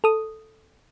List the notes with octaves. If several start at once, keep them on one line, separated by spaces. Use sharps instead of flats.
A4 D#6